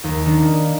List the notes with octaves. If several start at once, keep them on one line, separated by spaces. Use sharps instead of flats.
D#2
D#3 A#3 D4